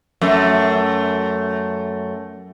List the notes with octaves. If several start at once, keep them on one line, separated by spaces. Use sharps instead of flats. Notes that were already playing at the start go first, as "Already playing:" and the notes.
F#2 A3